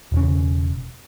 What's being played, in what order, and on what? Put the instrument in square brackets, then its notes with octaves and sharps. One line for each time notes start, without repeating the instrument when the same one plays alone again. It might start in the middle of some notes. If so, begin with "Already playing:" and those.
[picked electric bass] E1 C#3